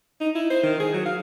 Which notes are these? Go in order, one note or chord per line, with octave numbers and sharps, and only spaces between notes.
D#4
E4
C5
D#3
G#4
F#3
F5